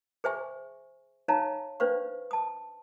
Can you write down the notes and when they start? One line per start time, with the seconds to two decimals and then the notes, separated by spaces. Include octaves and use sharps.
0.24 G#4 C5 E5 G#5 C#6
1.28 D#4 C#5 F5 A5 A#5
1.80 C#4 D4 B4 C5 F5 C#6
2.31 A5 D#6